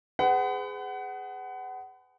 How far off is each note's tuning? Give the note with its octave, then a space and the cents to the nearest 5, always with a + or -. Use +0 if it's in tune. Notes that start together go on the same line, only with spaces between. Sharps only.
G#4 +0 B4 +40 F#5 +25